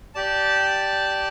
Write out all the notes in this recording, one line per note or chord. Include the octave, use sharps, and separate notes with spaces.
G4 D5 A5